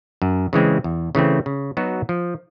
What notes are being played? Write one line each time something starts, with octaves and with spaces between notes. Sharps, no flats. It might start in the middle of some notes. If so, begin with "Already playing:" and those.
F#2
C#3 E3 G#3 C4
E2
C#3 E3 A3 C4
C#3
F#3 B3 D#4 F#4
F3